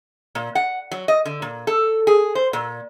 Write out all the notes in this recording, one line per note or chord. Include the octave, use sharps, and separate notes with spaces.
A#2
F#5
F#3
D#5
D3
A#2
A4
G#4
C5
A#2